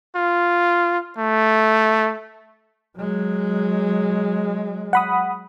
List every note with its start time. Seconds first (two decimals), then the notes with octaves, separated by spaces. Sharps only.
0.16 F4
1.19 A3
2.98 F#3 G#3
4.93 F#5 B5 D#6